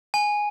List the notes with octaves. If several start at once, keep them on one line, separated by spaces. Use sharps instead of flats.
G#5